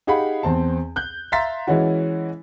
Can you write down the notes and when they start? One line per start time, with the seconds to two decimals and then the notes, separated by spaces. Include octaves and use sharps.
0.07 D#4 G4 G#4 F5 F#5 B5
0.43 E2 C4 A5
0.96 F#6 G6
1.32 E5 F5 A#5 C6 A6 B6
1.67 E3 G#3 C#4 E4 F#4